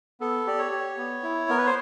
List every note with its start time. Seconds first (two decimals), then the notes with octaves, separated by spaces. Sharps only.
0.20 B3 A4
0.47 G4 D5
0.59 C#5
0.72 G4
0.97 B3
1.23 E4
1.49 B3 A#4
1.58 B4
1.66 C5